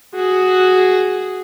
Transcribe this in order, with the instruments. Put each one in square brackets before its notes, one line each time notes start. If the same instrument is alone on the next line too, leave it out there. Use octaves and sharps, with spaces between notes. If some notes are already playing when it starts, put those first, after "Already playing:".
[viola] F#4 G#4